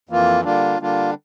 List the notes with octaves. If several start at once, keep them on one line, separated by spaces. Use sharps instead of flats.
F2 E3 A#3 F4
D3 G3 A#3 D4 F4
D3 G3 A#3 D4 F4